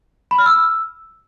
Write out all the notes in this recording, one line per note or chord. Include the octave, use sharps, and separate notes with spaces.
B5
F6
E6